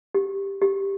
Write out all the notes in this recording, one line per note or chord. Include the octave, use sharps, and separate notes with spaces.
G4
G4